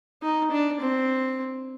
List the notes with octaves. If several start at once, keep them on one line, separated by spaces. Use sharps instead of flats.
D#4
D4
C4